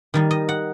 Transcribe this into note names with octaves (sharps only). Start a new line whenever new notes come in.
D#3 G3 D#4
D#5
F#5